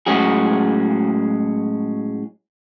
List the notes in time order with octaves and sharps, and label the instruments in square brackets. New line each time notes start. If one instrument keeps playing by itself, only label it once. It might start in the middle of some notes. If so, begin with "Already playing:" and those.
[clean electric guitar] A2 F#3 G#3 C#4 F#4 G#4